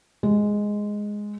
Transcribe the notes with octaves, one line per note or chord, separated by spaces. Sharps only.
G#3